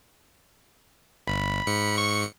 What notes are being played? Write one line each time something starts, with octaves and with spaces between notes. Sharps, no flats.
G1 B5
G#2 C#7
C#6